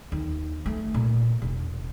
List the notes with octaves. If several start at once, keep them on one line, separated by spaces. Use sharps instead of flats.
D#2
A3
A#2
E1